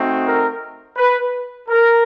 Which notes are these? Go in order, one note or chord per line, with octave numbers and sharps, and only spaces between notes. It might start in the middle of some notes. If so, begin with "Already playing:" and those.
Already playing: A3 C4 D#4 F#4
A#4
B4
A#4